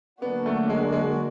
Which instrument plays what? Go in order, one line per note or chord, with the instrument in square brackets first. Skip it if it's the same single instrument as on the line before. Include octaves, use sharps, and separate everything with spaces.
[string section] D3 F#3 A#3 D4 F#4 [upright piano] B3
[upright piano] A3
G#3
G#3